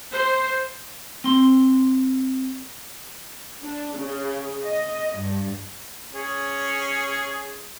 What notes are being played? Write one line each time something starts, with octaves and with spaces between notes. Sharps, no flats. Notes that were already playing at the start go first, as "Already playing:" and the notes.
C5
C4 C6
D4
C#3
D#5
G2
C#4 G#4